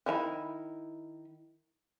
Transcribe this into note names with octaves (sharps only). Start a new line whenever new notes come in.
D#3 E4 A#5 B5